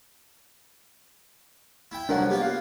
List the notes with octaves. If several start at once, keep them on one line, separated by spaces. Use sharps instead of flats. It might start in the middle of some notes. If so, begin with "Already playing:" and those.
E4 G5
C2 F3 F#3 D4 A#4 F#5
A#3 B3 F4 G4
F5